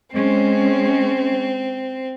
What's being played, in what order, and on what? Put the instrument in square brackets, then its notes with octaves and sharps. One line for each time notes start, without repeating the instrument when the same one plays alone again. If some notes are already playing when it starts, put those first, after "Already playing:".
[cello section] G#3 C#4 [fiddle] C4